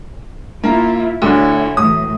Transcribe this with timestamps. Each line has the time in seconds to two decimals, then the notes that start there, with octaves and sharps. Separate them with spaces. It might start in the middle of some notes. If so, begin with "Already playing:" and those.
0.64 A#3 E4 F4
1.22 D2 D3 E4 C#5
1.77 A2 E3 F#3 D#6